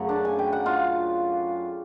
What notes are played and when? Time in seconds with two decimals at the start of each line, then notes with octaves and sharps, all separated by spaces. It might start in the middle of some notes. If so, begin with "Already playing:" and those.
Already playing: F#2 C#3 F#3 A3
0.09 D4 D5
0.25 G#5
0.39 G5
0.53 F#5
0.66 F4 F5